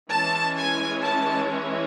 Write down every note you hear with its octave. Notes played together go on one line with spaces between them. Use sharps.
E3 G#3 C#4 E4 A5
G#5
A5